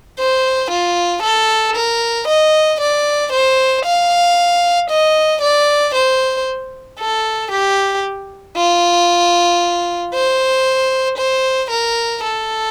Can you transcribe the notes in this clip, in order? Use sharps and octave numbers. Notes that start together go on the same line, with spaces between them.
C5
F4
A4
A#4
D#5
D5
C5
F5
D#5
D5
C5
A4
G4
F4
C5
C5
A#4
A4